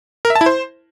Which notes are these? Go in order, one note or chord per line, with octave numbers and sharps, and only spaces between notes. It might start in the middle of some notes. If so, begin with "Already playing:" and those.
A#4
E5
A5
E4
C5